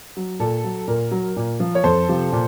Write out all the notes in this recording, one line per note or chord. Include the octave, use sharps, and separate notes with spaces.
F#3
A#2 A4
F#3
A#2 A#4
F#3
A#2
F3
C#5
F2 A4 C5
C3 F3
A#2